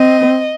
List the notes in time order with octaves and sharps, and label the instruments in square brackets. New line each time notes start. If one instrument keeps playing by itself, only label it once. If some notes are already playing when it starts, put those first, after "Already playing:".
Already playing: [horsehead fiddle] C4 [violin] D#5